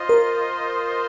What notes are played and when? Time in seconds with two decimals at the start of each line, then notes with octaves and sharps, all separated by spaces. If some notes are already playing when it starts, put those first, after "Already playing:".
Already playing: F4 C5 D#5
0.09 A#4